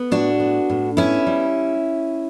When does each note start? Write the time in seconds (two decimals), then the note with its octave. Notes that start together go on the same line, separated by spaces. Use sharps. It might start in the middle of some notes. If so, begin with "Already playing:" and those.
Already playing: B3
0.11 A2 D4 F#4
0.40 B3
0.70 A2
0.97 B3 C#4 E4
1.27 G3